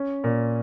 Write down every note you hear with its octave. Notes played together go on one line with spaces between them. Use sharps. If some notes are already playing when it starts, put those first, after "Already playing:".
Already playing: C#4
A#2